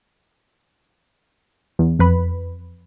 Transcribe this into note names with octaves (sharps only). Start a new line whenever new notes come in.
E2
F2 B4 B5